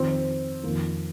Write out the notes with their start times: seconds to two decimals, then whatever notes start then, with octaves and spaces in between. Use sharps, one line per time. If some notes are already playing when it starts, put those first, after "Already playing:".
Already playing: F2 D#3 C4
0.63 F2 D#3 A#3